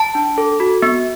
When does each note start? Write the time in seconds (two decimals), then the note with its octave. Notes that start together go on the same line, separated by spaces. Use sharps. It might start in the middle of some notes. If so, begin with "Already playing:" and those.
Already playing: A5
0.15 D4
0.38 A4
0.60 F#4
0.82 B3